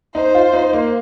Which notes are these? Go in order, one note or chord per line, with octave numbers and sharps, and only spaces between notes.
D#4 C5
F4
D#4
A#3